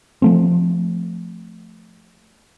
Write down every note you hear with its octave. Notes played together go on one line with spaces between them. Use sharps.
F3 A3 C4